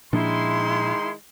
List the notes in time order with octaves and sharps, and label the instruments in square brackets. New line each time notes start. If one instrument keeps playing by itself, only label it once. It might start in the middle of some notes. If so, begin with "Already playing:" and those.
[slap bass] A#2 F3 D4 [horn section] D#3 G#3 C6 [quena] E4